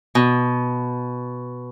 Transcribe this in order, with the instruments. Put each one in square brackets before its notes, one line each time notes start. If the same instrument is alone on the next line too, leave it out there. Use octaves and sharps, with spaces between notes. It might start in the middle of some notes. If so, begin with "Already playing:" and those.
[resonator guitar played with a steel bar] B2